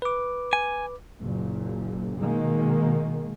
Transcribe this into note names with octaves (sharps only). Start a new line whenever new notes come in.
B4 D6
G#5
F#1 A#2
B2 D#3 G#3 A#3